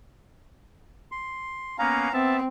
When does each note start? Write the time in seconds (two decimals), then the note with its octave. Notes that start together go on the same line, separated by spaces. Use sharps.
1.12 C6
1.79 A#3 B3 C#4 F5 A#5
2.14 B3 C4 E5 A5